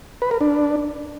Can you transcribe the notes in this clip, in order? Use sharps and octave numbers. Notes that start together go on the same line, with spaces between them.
B4
A#4
D4